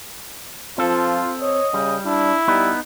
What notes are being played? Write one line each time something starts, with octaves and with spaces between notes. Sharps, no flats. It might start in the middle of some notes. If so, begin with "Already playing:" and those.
F3 C4 F4 A4
C#5 D#5
C#3 G3
D4 E4
G3 B3 D#4 B4